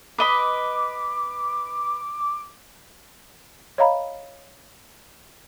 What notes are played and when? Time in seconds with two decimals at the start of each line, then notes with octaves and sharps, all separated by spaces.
0.18 B4 D#5 B5 D6
3.78 C#5 D#5 F5 A#5 B5